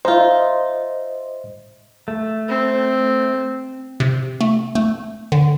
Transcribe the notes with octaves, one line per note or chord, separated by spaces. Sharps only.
D#4 F4 C5 D#5 E5
A3
C4
C3
A3
A3
D3